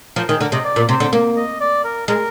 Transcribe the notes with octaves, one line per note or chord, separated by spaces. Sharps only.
F3 A#4
D#3 G#4
D3 A#4
C3 D#5
D5
A#2
C3 C5
D3
A#3
D#5
D5
A#4
G#3 A#4